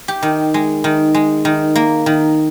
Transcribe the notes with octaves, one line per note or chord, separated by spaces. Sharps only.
G4
D#3
G#3
D#3
G#3
D#3
A#3
D#3